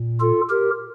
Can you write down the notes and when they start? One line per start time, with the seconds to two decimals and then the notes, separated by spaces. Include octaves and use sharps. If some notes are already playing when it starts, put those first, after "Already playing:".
Already playing: A#2
0.21 F4 A4
0.49 G4 A#4